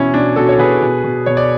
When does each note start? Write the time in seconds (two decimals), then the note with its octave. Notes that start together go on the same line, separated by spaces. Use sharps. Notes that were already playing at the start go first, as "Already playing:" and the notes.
Already playing: B2 E3 C#4 E4
0.14 B2 D4
0.36 B2 F#4 A4
0.49 C#5
0.59 B2 G#4 B4
0.82 B2
1.04 B2
1.26 B2 C#5
1.37 D5